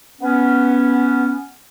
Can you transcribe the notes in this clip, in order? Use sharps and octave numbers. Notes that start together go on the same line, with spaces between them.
B3 C#4